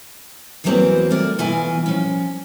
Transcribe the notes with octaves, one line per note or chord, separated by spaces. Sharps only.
E2 E3 F#3 A#3 C4
A3 A#4 D5
B2 E3 F4 D#5 G#5
F3 C#4